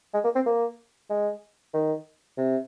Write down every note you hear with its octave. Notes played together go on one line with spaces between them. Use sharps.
G#3
A#3
C4
A#3
G#3
D#3
C3